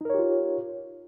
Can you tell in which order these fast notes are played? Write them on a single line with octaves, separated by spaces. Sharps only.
D#4 A#4 C#5 G4 F4